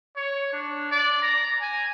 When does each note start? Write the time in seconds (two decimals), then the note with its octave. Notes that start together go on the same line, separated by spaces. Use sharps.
0.16 C#5
0.53 D4
0.91 D5
1.22 A#5
1.62 G#5